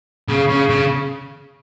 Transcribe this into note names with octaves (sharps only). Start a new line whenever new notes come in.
C#3
C#3
C#3